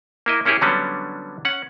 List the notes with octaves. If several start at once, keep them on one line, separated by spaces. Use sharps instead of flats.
A#3 E4 D#5
A#3 C#4 E4 G4 G#4
D3 F#3 G3 B3 C#4 D4
C#4 F#5